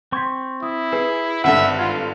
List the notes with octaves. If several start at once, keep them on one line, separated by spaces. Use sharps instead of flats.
C4 C6 C#6 G6 G#6 B6
E4 D#6
G#4 B4
G#1 G2 D3 B4 E5 F#5
F4 G#6